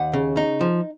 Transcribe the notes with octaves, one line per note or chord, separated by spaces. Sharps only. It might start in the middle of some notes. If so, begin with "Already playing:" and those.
Already playing: D#2 F#5
C#3
D#4
F3